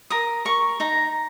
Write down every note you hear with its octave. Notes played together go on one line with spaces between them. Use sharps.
A#4 D#6
A#4 C#6
D#4 A#5